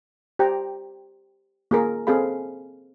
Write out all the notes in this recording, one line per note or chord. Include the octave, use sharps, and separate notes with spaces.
G4 C5 G5 A#5
A#3 G#4 A#4
C4 G#4 A4 F5 B5